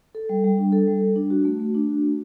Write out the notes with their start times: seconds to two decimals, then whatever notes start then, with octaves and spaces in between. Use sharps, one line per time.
0.15 A4
0.29 G3
0.44 G3
0.58 D4
0.72 A4
0.87 G3
1.01 G3
1.16 D4
1.30 F#4
1.45 A3
1.60 A3
1.75 D4
1.89 F#4
2.03 A3